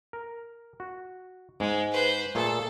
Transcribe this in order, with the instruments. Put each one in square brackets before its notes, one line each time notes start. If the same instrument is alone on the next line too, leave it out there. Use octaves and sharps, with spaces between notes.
[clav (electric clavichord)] A#4
F#4
[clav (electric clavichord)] G#2 [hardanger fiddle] G#3
[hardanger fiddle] B4 C5
[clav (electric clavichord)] A#2 A3 G#4 [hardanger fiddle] A4